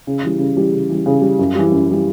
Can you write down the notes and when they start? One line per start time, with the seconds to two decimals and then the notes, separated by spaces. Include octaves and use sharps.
0.07 C#3
0.23 E3 G3
0.39 C#3
0.57 E3 G3
0.72 C#3
0.89 E3 G3
1.06 C#3
1.22 E3 G3
1.39 F#2
1.55 E3 G3
1.72 F#2
1.89 E3 G3